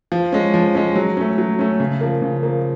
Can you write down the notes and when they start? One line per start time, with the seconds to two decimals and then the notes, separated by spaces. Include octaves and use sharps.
0.12 F3
0.32 G#3 C#4
0.54 F3
0.75 G#3 C#4
0.96 F#3
1.17 A3 C#4
1.38 F#3
1.59 A3 C#4
1.80 C#3
2.01 F3 A#3
2.22 C#3
2.43 F3 A#3